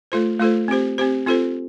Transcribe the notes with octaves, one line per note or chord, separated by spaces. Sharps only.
A3 F4 A4 C5
A3 F4 A4 C5
C4 G4 C5
C4 G4 C5
C4 F4 A4 C5